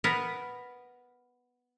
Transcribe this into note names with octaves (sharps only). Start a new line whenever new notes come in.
B3 A#4 B4